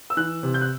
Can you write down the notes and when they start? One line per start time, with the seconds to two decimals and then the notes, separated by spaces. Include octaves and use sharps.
0.10 E6
0.17 E3 F#6
0.43 C3
0.54 G6
0.61 F#6